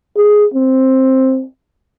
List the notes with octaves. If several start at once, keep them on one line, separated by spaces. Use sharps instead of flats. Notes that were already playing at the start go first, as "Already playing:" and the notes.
G#4
C4